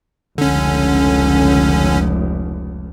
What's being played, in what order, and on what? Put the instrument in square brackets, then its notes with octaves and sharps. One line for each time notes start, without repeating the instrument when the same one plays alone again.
[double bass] F1 C#2 [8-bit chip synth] D3 C#4